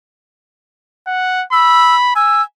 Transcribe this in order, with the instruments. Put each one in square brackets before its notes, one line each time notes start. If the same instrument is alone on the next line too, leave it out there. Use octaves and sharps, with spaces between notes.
[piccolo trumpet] F#5
[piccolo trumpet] B5 [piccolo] E6
[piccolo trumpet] G#5 [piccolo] E6